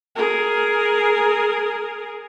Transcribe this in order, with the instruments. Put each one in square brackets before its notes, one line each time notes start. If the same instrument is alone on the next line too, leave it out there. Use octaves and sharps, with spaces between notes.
[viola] G#4 A#4